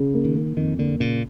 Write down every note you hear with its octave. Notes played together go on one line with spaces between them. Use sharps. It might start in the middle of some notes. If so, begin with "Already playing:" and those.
Already playing: C#3
A#3
D#3
A#3
F2 D#3
D3 A#3
A#2 C#3